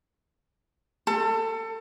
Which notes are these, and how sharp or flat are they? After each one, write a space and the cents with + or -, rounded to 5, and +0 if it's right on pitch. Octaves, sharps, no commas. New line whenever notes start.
A4 +30